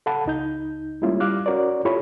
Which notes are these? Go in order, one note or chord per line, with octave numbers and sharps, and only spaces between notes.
A4 F5 F#5 A5 B5
C#2 D#4 G6
G3 G#3 A#3 C#4 E4 F4
G3 F5 D6 F6 F#6
C#4 F#4 A#4 C#5 D5
E4 F4 G4 A4 C#5 B5